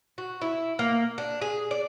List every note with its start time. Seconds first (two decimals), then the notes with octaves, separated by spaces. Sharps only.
0.18 F#4
0.42 E4
0.79 A#3
1.18 D4
1.42 G#4
1.71 D5